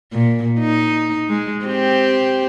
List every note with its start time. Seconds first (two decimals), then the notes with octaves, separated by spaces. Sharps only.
0.13 A#2
0.59 D#4
1.29 G#3
1.65 C4 G4